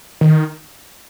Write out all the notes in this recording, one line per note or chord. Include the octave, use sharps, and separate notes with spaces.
D#3